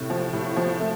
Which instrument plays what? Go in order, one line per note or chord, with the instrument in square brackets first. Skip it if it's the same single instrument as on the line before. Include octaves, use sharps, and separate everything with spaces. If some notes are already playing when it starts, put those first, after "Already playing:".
Already playing: [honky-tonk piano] A2 [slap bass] C3
[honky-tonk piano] F3
A2
F3
A3